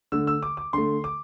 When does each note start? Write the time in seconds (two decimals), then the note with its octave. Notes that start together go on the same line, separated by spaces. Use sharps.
0.12 D3 A3 E6
0.27 E6
0.43 D6
0.57 D6
0.73 D3 A3 C6
1.04 D6